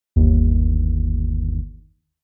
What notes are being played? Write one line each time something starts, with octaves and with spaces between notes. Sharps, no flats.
G1 D#2